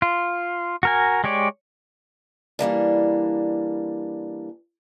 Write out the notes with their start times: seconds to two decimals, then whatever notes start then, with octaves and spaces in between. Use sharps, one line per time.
0.02 F4
0.83 F#4 A#4 G#5
1.24 G#3 G4 C#5 D5
2.59 E3 G3 A#3 D4